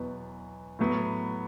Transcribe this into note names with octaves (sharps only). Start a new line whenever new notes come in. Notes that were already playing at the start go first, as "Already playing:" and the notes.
Already playing: E2 B2 F#3 B3
A2 F#3 B3